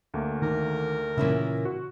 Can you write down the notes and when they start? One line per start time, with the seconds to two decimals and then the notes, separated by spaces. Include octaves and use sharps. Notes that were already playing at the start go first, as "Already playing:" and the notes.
0.14 D2 A3 A#3
0.42 D#3 A#4
1.18 A#2 C#3 E3 C#4 E4
1.65 F#4